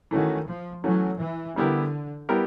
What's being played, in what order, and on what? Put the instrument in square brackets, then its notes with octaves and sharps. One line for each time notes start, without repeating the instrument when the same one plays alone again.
[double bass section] D#3 [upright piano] E3 A3 C#4 F#4
[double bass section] F3
[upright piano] E3 A3 C#4 F#4 [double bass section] F#3
[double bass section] E3
[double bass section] D3 [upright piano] G3 B3 E4 G4 A#4
[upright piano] G3 B3 E4 G4 A#4